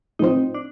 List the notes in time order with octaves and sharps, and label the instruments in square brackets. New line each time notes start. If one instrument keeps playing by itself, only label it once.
[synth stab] A2 F3 C4 [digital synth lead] D#4
[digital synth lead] D4